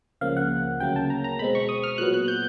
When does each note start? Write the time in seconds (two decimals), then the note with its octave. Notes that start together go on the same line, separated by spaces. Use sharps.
0.21 C#2 C#3 F3 A#3 F5
0.37 F#5
0.80 D2 C#3 F#3 A#3 G5
0.96 A5
1.10 A#5
1.24 A#5
1.39 B2 G#3 C4 B5
1.55 C#6
1.69 D#6
1.83 F6
1.98 A#2 F#3 B3 F#6
2.14 F#6
2.28 G6